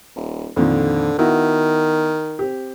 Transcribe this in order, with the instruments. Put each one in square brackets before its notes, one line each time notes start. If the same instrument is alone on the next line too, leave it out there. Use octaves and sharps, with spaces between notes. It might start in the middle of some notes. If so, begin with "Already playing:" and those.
[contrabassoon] D#1
[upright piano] F2 A#2 D#3 [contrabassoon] D3
[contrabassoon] D#3 [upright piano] B3 E4 F#4
[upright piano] C4 G4